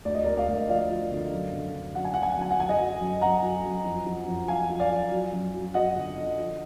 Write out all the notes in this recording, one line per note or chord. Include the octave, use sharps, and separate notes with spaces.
D2 D5
D#5
D2 A#4 D5
D5 F5
D2
F3 D5 F5
F3
D3
F#2
D3
D3
F#2 F#5
G#5
D3 F#5
G#5
F#5
F#2 G#5
F#5
F#2 G#5
D#5 F#5
F#3
F#2
F#2 F#5 A#5
F#3
F#2
F2
F2
F2
F3 F5 G#5
F3
D5 F5
F3
F#3
F#2
F#3
F#3 D#5 F#5
D3
D3
F3